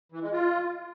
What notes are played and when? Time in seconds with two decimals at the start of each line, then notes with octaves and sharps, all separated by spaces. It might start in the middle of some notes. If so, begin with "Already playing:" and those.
0.12 E3
0.22 G#3
0.33 F4